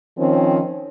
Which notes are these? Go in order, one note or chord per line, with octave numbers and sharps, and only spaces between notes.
D#3 F3 C4 C#4